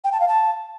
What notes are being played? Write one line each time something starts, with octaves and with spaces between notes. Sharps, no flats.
G5
A5
F5
A5